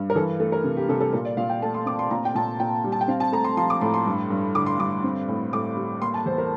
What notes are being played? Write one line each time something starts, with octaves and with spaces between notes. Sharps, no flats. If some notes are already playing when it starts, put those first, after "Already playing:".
Already playing: G2
A#4
E3 A4
A3
A#4
C3
G4
C3 A4
A4
A#2 A#4
D5
A#2 F5
G5
A3 A5
C6
C4 D6
C6
A#2 A#5
G5
A#2 A5
A#2 G5
G3
A5
G5
C4 F5
A5
A3 A#5
C6
F3 C6
D6
A2 C6
C6
G2
G2
D3 D6
C6
G2 D6
C4
A2
A2 D6
G3
A#3 C6
A5
E2 C5
A#4